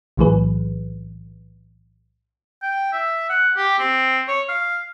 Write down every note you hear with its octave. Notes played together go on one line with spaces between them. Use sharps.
B1 A2 E3 F#3 G#4 B4
G5
E5
F#5
G4
C4
C#5
F5